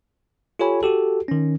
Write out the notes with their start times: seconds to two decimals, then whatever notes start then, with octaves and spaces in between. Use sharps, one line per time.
0.59 F4 G4 A4 C#5 G#5 B5
0.83 F#4 G4 A4
1.28 D#3 C#4